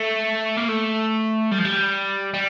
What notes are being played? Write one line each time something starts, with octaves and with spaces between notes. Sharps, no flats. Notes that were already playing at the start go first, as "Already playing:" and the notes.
Already playing: A3
A#3
A3
G3
F3
G3
G3